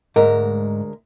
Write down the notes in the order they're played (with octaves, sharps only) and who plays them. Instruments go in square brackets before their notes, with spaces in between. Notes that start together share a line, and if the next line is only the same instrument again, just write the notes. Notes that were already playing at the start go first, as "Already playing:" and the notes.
[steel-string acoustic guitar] D2 G#3 A#4 [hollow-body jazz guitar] G#2